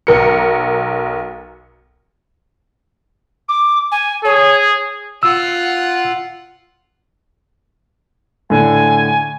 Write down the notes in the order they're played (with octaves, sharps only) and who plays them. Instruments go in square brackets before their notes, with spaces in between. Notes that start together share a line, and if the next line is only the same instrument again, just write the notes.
[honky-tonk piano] B1 A#4 C#7
[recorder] D6
G#5
[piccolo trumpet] G#4 [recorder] C#5
[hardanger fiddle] F4 F#5 [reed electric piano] E6
[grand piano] A2 D3 [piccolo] G#5